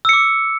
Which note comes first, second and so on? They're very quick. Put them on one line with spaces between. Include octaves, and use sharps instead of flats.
E6 C#7 D6